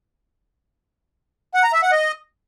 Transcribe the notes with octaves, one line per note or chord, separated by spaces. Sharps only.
F#5
A#5
E5
F#5
D#5